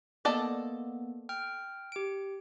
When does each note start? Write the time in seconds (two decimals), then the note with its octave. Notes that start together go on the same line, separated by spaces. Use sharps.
0.25 A#3 B3 A4 D5 D#5
1.29 G5 F6
1.92 G4 D7